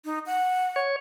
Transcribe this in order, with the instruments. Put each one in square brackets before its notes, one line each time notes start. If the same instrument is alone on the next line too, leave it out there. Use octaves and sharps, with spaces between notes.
[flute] D#4
F#5
[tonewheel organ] C#5